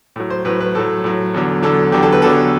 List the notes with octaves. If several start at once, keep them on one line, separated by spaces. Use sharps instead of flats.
A2 F#3
C5
A2 F#3 B4
B4
A2 F#3 A4
A2 F#3
E2 D3 F#3
E2 D3 F#3 A4
E2 D3 F#3 G4
A4
B4
E2 D3 F#3 A4